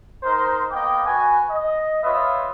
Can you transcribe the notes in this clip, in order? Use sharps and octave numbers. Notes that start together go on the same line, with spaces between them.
D#4 A#4 C5
A#3 B3 D#5 G5 D6
F#4 B4 G#5
D#5
F4 B4 C#5 D#5 E5